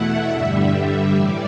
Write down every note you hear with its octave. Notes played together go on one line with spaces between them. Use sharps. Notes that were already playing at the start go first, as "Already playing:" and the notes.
Already playing: E2 B2 A3 E4 E5 F#5
G2 D3 G3
A2 E3 G3 D5